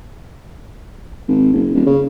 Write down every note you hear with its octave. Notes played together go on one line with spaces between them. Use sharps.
G#1
F#1
D#1
C#3